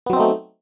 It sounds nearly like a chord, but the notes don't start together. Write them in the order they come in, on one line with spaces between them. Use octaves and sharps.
B3 F#3 C4 D#4 A3